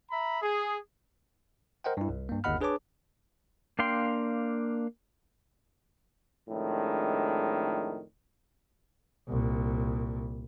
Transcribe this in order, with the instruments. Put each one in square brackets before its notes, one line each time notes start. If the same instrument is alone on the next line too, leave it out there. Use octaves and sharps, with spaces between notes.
[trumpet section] E5 A#5 B5
G#4
[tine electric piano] A#4 C5 D#5 F#5 G5
G2 E4
C2
G2 A#3
G1 D#2 D#5 F#5 B5 F6
D4 G#4 B4 C#5 A5 D6
[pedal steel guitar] A#3 D4 F5 G5 C6
[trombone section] F2 A2 D#3 G#3 D4
[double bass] C2 A#2